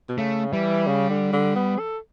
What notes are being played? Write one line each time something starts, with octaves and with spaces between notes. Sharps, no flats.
B2
C#3 A3
E3 G3
C#3
D3
D3
B3
A4